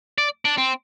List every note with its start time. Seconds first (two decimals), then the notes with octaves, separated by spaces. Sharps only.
0.18 D5
0.45 D4
0.58 C4